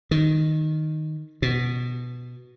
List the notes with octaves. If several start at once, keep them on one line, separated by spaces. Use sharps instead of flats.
D#3
B2